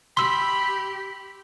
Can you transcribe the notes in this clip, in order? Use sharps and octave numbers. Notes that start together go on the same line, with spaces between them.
G4 B5 C6 E6